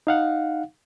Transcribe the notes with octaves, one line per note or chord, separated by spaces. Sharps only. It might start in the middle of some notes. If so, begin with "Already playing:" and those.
D#4 F5 F#5